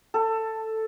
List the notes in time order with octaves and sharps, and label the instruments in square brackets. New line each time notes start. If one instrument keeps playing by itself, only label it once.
[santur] A4